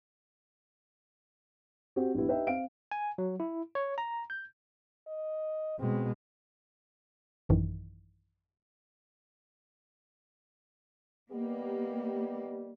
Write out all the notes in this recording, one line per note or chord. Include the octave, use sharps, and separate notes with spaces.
C4 F#4 G4
A#1 G3 B3 E4
D#4 G4 B4 E5 G5
C4 F5 D7
G#5
F#3
E4
C#5
A#5
G6
D#5
B2 G#3 C4
A1 F#2 D#3 E3
D#3 G3 A#3 B3 G4